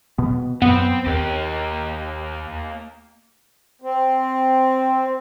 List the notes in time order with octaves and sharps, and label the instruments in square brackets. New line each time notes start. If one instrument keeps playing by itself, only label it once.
[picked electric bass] B2 B3
[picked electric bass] F#2 [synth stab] B3 [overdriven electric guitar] C4
[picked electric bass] D#2 [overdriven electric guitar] A#3 G4
[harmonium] C4